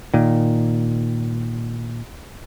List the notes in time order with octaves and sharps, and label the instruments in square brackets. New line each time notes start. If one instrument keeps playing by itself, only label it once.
[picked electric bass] A#2 D#3